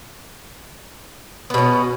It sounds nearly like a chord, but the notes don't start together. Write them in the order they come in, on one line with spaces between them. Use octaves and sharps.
B3 B2 C#4